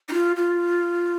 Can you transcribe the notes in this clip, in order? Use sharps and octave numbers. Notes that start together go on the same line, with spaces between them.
D#4
F4
F4